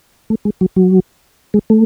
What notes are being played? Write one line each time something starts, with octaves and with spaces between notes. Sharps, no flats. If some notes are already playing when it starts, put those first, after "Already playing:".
A3
G#3
F#3
F#3
G#3
A3